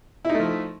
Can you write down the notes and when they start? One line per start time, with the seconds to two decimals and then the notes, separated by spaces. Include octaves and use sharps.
0.25 E4
0.30 D#4
0.35 A3
0.39 F3